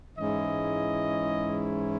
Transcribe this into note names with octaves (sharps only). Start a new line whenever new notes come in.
G#2 E3 G#3 C#4 E4 D#5